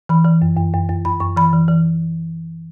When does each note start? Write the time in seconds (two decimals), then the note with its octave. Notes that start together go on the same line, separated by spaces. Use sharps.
0.09 E3 B5
0.25 E3
0.42 F#2
0.57 F#2
0.74 F#2
0.89 F#2
1.05 F#2 B5
1.20 F#2 C#6
1.36 E3 B5
1.53 E3
1.68 E3